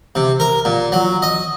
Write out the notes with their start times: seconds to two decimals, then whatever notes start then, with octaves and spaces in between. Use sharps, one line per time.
0.15 C3
0.40 A#4
0.65 A#2
0.92 F#3
1.22 D#5